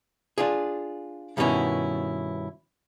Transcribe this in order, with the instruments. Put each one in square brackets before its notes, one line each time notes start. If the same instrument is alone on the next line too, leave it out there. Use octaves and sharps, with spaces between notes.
[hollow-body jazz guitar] D4 F4 G#4
G2 B2 D#3 B3 C#4 E4